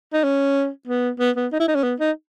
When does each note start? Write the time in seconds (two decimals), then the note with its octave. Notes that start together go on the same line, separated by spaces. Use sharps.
0.13 D#4
0.24 C#4
0.88 B3
1.19 B3
1.36 B3
1.52 D#4
1.60 E4
1.68 D#4
1.75 C#4
1.83 B3
2.00 D#4